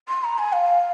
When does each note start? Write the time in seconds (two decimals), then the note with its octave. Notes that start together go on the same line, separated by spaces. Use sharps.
0.08 C6
0.23 A#5
0.38 G#5
0.52 F5